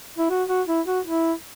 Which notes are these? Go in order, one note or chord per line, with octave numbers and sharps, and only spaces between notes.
E4
F#4
F#4
E4
F#4
E4